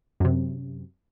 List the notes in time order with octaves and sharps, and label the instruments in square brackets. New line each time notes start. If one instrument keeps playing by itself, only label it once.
[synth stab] F#2 C3